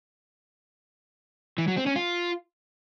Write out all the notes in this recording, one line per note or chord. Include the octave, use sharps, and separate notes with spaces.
E3
F#3
C4
C#4
F4